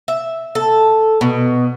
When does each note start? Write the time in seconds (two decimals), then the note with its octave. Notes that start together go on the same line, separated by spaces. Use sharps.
0.08 E5
0.55 A4
1.21 B2